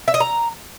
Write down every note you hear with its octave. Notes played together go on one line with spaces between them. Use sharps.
E5
D#5
A#5